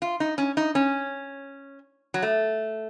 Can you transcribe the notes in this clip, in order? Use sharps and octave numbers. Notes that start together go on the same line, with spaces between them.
F4
D#4
C#4
D#4
C#4
F#3
A3